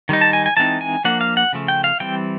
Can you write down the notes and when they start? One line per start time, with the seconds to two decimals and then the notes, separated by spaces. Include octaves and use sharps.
0.09 D#3 G3 D#4
0.21 A5
0.33 G#5
0.46 G#5
0.57 E3 G#3 C4 D#4 A5
0.81 G#5
1.05 F3 A#3 D4 F#5
1.21 F5
1.37 F#5
1.53 C#3 F3 A3
1.68 G5
1.84 F5
2.00 E3 G3 C4 G5